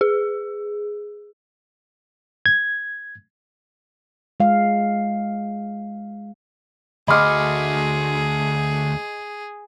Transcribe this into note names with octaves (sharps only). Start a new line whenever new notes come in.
G#4
G#6
G#3 F5
D2 F#4 G#4 D#5 B5 C6 D6 F6